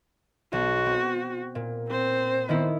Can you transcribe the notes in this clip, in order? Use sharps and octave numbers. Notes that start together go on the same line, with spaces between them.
B1 F#4
C4
A#2
C4 C5
D#3 B3 E4